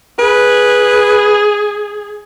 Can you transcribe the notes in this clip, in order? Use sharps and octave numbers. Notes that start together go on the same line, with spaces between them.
G#4 B4